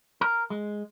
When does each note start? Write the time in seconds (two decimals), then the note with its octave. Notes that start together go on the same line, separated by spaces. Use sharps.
0.21 A#4
0.50 G#3